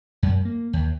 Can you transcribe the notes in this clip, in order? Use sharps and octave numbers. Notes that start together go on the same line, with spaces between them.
F#2
A#3
D#2